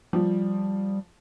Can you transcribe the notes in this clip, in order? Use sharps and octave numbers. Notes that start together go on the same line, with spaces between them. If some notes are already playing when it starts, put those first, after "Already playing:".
F3 G3